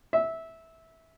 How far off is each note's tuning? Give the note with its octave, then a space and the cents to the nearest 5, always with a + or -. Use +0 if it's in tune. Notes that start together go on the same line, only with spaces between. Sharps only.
E5 -15